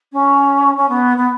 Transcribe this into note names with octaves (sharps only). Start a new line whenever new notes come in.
C#4
C#4
B3
B3